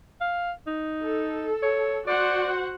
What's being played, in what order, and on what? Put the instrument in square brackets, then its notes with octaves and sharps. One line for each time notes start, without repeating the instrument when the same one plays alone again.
[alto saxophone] F5
D#4
[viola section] A4
[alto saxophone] C#5
[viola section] F#4 C5 F#5 [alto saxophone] D5